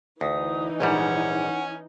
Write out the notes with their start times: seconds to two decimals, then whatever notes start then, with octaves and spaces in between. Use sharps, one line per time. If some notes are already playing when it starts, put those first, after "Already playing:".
0.21 D2 E3 D#4 D#6
0.80 A#1 G#2 G3 C#4 F#5 G#5